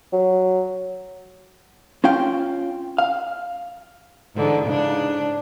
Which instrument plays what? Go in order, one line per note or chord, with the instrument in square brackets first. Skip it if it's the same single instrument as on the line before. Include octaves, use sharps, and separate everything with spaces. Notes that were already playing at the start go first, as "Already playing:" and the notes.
[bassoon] F#3
[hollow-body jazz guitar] C#4 F4 F5 G5
F5
[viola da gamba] G#2 D3 E3
G#2 C#3 D4